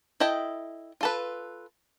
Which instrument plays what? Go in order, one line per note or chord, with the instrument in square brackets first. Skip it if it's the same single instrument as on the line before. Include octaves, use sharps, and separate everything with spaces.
[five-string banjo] E4 A4 D#5 G5
F4 A4 B4